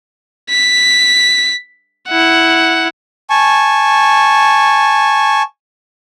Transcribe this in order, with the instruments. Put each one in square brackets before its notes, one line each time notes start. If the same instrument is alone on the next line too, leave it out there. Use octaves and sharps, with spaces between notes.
[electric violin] B6
E4 F#5
[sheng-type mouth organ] G#5 A5 C#6